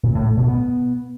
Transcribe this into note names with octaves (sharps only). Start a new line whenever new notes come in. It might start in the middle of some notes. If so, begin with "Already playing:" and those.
A#2
A2
A3
B2
B3